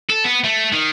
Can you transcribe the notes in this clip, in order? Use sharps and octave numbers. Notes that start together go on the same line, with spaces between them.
A4
B3
A3
D#3